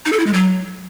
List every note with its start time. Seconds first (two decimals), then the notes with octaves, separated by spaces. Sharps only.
0.06 D#4
0.13 A4
0.20 E4
0.27 G#3
0.34 F#3